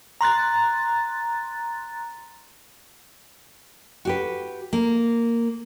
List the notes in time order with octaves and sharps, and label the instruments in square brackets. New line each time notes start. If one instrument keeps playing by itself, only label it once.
[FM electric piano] A#5 C6 F#6 A6
[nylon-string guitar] F#4 G4 B4
A#3